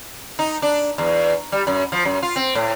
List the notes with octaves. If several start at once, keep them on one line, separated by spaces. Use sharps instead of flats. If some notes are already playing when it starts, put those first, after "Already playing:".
D#4
D4
E2
G3
F#2
F3
F#2
F4
C4
A2